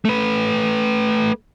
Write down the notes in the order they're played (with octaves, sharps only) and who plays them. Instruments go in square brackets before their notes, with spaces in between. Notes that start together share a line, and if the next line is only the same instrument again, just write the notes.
[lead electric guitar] A3 B4